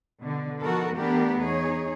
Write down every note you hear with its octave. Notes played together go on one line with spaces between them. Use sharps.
B2 D3
F3 B3 D#4 F#4 A4 A#4
E3 A3 B3 D4 G4 A#4
E2 D#4 G#4 C#5